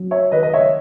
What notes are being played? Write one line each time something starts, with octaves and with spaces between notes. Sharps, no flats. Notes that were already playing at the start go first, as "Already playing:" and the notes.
Already playing: F#3
C#5 E5
D#3 B4 D#5
D#5
C#5 E5